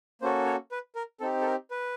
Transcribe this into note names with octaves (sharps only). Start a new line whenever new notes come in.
A#3 C#4 F#4 A4 C5
C#5
B4
A#4
C4 D#4 G4 A4
A4
A#4
B4